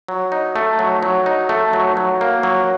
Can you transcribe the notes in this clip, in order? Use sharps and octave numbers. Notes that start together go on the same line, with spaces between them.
F#3
D#4
A3
F#3
F#3
D#4
A3
F#3
F#3
A#3
F#3